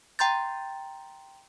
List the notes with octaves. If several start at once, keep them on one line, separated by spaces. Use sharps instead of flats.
G5 A#5 C6 G6 A6